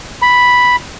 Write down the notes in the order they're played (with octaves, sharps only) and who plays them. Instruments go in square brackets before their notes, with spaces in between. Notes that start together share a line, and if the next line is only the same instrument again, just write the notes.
[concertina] B5